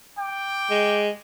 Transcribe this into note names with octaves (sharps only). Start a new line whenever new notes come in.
G5 D6
G#3